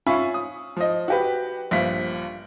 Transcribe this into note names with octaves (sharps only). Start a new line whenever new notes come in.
C#4 F4 E5 G#5 B5 C#6
D#6
F3 D#5
F#4 G4 B4
A#1 G2 F4 B6